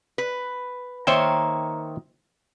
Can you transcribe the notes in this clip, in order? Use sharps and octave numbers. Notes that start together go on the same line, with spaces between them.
B4
D#3 A#3 C5 C#5 E5 G5